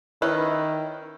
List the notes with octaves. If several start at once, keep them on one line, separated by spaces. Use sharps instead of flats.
D#3 C#4 E4 B4